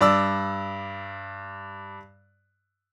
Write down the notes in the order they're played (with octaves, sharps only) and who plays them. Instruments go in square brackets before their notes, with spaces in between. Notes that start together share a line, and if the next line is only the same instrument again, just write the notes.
[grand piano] G2 D5 E6